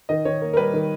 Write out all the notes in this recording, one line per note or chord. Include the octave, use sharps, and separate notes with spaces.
D#3 D#5
D#3 C#5
A#3
A#4
G3 B4
D#3